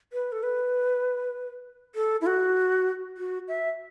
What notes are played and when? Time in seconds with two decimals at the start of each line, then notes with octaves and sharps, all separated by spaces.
0.13 B4
0.32 A4
0.43 B4
1.95 A4
2.21 E4
2.26 F#4
3.17 F#4
3.48 E5